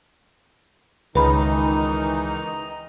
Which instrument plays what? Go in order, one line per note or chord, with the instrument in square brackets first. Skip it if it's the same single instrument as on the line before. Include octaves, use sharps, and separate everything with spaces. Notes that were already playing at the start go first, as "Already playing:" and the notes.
[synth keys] C#2 [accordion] D#3 E3 D#4 [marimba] B4 B5 [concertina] D#5 A#5